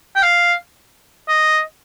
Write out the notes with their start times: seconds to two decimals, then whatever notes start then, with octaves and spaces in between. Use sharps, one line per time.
0.16 G5
0.23 F5
1.28 D#5